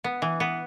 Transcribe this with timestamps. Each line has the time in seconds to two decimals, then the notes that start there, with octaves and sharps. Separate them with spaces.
0.04 B3
0.22 E3
0.40 B3